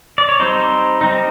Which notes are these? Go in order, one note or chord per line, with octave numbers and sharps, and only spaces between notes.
D5
C#5
G3 C4 D#4 C5
G3 C4 D#4